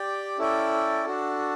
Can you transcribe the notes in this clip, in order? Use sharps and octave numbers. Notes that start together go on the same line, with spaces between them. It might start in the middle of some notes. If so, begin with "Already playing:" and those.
Already playing: G4 D5 G5
C#4 E4 A4 D5 G5
D4 F#4 A4